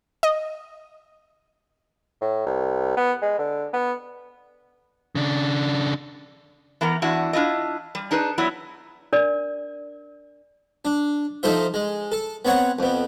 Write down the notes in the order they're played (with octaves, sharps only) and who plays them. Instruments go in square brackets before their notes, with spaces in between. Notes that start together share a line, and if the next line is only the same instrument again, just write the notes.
[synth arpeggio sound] D#5
[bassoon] A2
C2
B3
G#3
D3
B3
[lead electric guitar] C#3 D4
[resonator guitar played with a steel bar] E3 B3 A#4 A#5
E2 D4 E4 F#4
D4 E4 F4 D#5
G3
D4 D#4 G#4 B4
F#3 B3 E4 D5
[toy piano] D4 A#4 D5
[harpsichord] D4
F3 A3 D#4 F4 C5 E5
G#3
A4
B3 C4 C#5 F#5 A#5
F2 B3